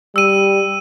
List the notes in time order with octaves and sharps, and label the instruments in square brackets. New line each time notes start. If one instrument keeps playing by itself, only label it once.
[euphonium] G3 [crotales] E6 D#7